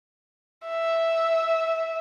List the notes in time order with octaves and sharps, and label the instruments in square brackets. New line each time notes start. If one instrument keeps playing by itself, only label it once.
[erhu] E5